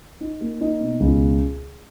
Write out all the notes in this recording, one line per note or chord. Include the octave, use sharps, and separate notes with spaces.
D#4
A#3
D#4
B2
C#2